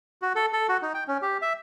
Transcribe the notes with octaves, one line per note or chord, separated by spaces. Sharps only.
F#4
A4
A4
F#4
D#4
G5
C#4
G4
E5